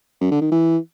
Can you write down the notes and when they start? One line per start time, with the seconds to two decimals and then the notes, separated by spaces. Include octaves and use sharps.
0.21 F#2
0.31 D3
0.41 D#3
0.51 E3